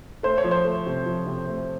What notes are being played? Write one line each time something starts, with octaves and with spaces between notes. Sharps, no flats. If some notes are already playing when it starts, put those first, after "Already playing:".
A3 C5
C#5
F3
C5
A3
C3
F3
C3
A3